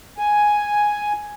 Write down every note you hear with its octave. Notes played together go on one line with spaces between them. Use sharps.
G#5